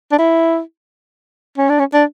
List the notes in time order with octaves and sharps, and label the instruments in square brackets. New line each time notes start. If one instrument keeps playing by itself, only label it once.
[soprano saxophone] D4
E4
C#4
D4
C#4
D4